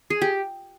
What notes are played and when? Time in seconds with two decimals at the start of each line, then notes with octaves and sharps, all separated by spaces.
0.10 G#4
0.22 G4